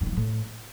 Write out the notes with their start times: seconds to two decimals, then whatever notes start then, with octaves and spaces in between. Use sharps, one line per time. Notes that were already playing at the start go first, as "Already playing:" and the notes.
0.01 G2
0.06 D#3
0.11 F3
0.17 A2